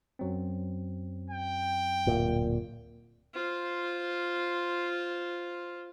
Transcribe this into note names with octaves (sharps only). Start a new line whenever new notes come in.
F#2 F#3 C4
G5
D1 A#2
F4 C5